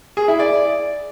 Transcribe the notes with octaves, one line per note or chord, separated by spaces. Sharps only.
G#4
E4
D5